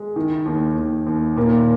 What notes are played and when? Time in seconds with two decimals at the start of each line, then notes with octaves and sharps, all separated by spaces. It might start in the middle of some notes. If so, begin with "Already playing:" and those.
Already playing: G#3
0.16 D#3
0.46 D#2
0.77 D#2
1.07 D#2
1.36 D#2 A#2 A#3